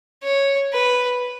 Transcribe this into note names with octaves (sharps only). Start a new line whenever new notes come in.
C#5
B4